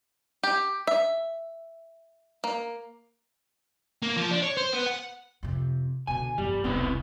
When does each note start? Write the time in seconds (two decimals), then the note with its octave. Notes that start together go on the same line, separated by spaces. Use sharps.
0.43 G4
0.87 E5
2.44 A#3
4.02 A#3
4.17 F3
4.31 D4
4.43 C#5
4.57 C5
4.73 B3
4.87 F#5
5.43 F2 C3
6.07 B2 D3 G#5
6.38 G1 F2 G3
6.64 E1 C2 B3 C4 E4